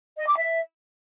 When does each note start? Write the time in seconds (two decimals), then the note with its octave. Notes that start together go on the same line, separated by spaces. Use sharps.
0.18 D#5
0.27 D6
0.36 E5